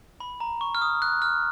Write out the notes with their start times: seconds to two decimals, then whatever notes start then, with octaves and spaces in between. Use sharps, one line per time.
0.20 B5
0.40 A#5
0.61 C#6
0.75 F6
0.82 D#6
1.02 F#6
1.22 F6